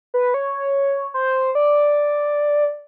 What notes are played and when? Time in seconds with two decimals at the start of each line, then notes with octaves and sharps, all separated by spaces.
0.14 B4
0.34 C#5
1.14 C5
1.55 D5